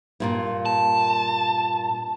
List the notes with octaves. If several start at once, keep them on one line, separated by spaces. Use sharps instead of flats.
G2 A#2 A#3
A5